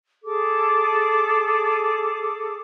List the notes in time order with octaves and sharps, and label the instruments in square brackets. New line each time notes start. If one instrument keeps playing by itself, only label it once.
[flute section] G#4 A4 D6